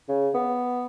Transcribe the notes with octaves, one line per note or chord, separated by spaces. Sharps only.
C#3
B3